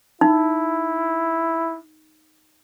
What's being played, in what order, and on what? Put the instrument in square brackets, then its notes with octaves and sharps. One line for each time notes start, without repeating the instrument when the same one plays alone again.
[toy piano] D#4 [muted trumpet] E4